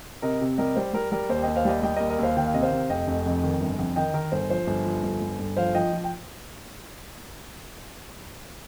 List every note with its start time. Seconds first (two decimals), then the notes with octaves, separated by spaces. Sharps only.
0.22 C3 A#4 D#5
0.41 C3
0.58 G3 A#4 D#5
0.76 G3 C5
0.93 G3 A#4
1.12 G3 A#4
1.29 D#2 C5
1.43 D#2 D#5 G5
1.56 C5 F5
1.65 G3 D#5 G5
1.82 G3 D#5 G5
1.96 D#2 A#4 D#5
2.10 A#4 D#5
2.19 D#2 C5 F5
2.37 D#3 G5
2.46 F5
2.54 C3 D#5
2.63 C5 F5
2.72 C3
2.90 F1 D#5 G5
3.07 F1
3.26 F2
3.43 D#3
3.61 G1
3.79 F2
3.96 D#3 D#5 G5
4.14 D#3 A#4
4.32 G1 C5
4.50 F3 C5
4.67 G1
4.85 F3
5.03 G1
5.22 G1
5.39 G1
5.57 F3 C5 F5
5.74 F3 D#5 G5
5.93 F3
6.04 G5